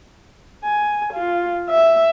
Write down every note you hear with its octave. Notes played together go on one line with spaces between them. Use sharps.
G#5
F4
E5